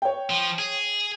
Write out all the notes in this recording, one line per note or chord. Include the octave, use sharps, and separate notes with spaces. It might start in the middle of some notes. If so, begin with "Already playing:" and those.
C#5 G5
F3
G#4